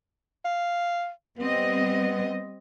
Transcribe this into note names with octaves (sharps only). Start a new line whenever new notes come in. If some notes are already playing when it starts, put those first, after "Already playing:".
F5
G3 B3 C4 D#5